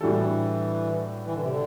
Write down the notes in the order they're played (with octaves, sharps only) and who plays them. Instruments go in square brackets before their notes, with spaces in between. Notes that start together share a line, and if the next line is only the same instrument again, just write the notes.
[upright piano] A2 G3 D4 F#4 A4 [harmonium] E3
[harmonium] E3
D3
C3
D3